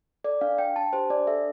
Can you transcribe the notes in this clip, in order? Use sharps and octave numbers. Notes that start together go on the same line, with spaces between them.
A4 D5
D4 F5
D4 G5
D4 A5
G4 C5
D4 D5
A4 E5